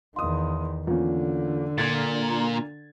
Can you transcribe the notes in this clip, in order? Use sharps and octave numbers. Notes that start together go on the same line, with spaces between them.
E2 D#3 F5 C6 D#6
E2 D3 A#3 C#4 F4
A#2 D4 G#6 A6